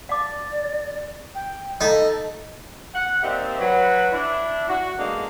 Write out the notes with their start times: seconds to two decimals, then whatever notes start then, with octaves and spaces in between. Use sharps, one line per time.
0.09 D5 F5 A5 D6
1.35 G5
1.81 D#4 A4 D#5 F5 A#5
2.94 F#5
3.23 A#3 C4 D#4 G4 D5 E5
3.59 F#3 B4
4.12 D4 E4
4.68 F#4
4.98 D3 G#3 A#3 B3 D4 D#4